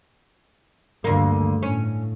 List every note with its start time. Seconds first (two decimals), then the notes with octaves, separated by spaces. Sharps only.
1.04 D2 G2 D3 A#3
1.63 A2 C#4